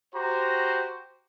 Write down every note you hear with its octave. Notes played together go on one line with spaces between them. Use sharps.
F#4 G4 C5 A#5